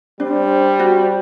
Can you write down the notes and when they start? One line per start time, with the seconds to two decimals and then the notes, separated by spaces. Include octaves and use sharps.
0.20 G3 D4 C5
0.79 F#4